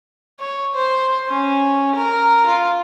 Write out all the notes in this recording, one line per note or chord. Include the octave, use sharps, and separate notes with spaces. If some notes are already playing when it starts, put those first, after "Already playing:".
C#5
C5
C#4
A#4
F4